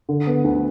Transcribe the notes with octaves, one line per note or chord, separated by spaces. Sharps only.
D3
B3
D2